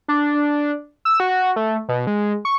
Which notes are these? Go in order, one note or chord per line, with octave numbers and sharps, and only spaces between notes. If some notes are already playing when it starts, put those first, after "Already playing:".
D4
E6
F#4
A3
B2
G#3
C#6